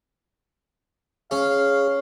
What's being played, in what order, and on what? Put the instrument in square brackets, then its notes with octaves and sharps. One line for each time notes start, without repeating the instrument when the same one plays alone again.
[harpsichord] C#4 [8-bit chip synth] G#4 [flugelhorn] F5